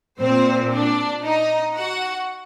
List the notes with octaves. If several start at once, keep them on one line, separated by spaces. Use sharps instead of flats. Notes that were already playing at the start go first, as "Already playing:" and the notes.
A#2 C4 C5
D4 D5
D#4 D#5
F#4 F#5